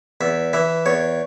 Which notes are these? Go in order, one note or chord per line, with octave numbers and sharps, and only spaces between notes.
E2 E5
E3 E5
E2 C#5